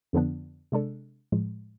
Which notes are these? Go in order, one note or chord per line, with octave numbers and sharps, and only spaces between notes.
F2 D3 F3 B3 D4
C3 G#3 D4 A4
A2 F3 G#3